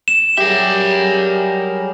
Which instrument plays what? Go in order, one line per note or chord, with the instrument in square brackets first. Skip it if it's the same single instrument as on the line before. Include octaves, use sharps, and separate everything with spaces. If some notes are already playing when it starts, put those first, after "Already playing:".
[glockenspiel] E7
[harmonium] F#3 G3 G#4 [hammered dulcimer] G4 [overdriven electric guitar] A#4 E5